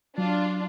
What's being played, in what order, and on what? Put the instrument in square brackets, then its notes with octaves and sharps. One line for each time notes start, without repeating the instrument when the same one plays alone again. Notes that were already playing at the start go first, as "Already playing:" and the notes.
[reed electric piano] F#3 [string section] D4 F4